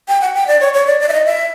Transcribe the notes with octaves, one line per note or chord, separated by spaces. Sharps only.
G5
F#5
G5
D5
C#5
C#5
D5
D5
E5
D#5
E5